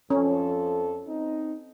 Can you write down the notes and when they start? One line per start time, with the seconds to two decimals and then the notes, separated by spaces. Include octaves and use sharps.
0.10 F2 F3 C#4 A4
1.08 C4 D#4